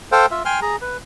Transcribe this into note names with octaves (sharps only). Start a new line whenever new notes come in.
A4 C5 F5 G5
F4 E5
G5 G#5 C6 F6
G#4 A#5
B4